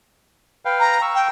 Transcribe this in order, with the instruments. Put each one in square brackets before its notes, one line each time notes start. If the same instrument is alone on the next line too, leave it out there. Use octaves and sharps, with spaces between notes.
[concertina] B4 F5 G5
[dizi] A#5
[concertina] A#5 C#6 E6
[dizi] G5